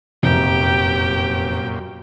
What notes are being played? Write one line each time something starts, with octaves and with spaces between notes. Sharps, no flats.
F1 F#2 A#2 G4 G5